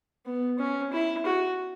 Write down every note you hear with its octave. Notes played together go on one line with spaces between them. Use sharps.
B3
C#4
E4
F#4